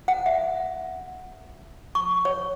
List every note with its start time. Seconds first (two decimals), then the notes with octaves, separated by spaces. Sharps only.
0.08 F#5
0.26 E5
1.95 C#6
2.25 C#5